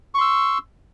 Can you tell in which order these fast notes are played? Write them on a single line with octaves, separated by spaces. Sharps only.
C#6 C6 E6